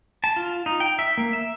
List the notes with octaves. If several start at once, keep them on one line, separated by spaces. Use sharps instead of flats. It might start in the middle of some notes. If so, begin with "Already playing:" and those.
A5
F4
D#4
G5
E5
A#3
E5